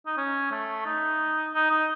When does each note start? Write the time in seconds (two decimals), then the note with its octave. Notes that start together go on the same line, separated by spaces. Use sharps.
0.06 D#4
0.17 C#4
0.51 A3
0.86 D#4
1.54 D#4
1.71 D#4